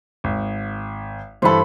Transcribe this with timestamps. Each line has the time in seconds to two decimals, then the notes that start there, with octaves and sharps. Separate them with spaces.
0.24 G#1
1.42 G2 E3 A4 C5 B5